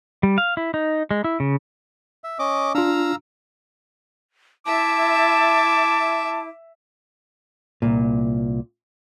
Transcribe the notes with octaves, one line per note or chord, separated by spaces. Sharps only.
G3
F5
E4
D#4
G#3
E4
C#3
E5
C#4 D#5 D6
D4 F4 F5 A#5 E6
E4 E5 A5 D6
C2 A#2